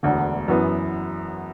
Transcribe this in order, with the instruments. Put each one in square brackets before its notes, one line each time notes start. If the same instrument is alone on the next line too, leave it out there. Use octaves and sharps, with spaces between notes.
[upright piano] E1 D2 D3
F#2 E3 B3